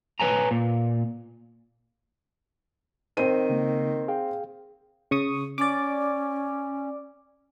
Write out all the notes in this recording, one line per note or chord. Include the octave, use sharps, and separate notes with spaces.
B4 C#5 G#5 A#5
A#2
D#3 C4 C5 D#7
C#3 A#3
G#4 F5 G5
C#3 C#6 D#6
C#4 D5 D6